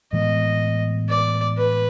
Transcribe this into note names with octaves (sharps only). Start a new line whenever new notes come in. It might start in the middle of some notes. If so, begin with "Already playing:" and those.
A2 E3 G#3 B3 D#5
D5
B4